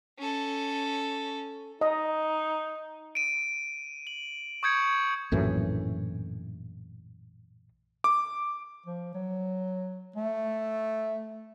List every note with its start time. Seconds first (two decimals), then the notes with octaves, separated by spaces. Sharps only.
0.18 C#4 A4
1.81 D#4 D#5
3.15 D7 D#7
4.07 F#7
4.63 C#6 D#6 G6 G#6 C#7
5.32 A#1 F#2 A2 E3
8.04 D6
8.86 F3
9.14 F#3
10.16 A3